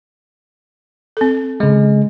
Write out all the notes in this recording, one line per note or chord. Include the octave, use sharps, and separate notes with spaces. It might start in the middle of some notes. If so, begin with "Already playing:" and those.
C4 A4
C#3 G#3